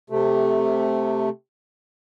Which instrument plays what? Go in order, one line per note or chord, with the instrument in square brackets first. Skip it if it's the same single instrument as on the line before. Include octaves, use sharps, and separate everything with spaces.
[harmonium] C3 A3